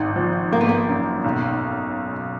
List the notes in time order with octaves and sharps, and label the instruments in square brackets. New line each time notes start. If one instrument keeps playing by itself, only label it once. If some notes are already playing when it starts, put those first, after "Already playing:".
Already playing: [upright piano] G#1 G#2 [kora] D#3
[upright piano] F3
[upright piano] G#1 [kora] A#3
[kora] B3
A#3
[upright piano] F#2
B1